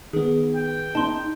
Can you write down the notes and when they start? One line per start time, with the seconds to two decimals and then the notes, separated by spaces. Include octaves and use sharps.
0.13 D#3 B3 G#4
0.56 G5
0.95 D#4 A5 C6